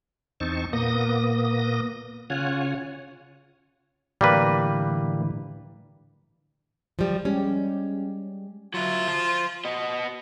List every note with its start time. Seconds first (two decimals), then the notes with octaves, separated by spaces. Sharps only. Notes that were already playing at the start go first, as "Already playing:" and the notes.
0.40 E2 C4 D#4 A5 C#6
0.73 A#2 A#3 B3 D#6 A#6
2.30 C#3 F4 C#5 F#5 G#5
4.21 A2 D3 E3 G3 A#3 B4
6.99 F3 G3
7.25 G3 G#3 C#4 G4
8.74 F#3 E4 F4
9.08 F3 C5
9.65 B3 D#5